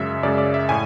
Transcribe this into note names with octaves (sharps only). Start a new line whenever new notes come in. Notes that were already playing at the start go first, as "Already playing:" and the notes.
Already playing: F#2 C#3 G#3 E5
F#2 C#3 G#3 D5
D5
E5
A2 G#5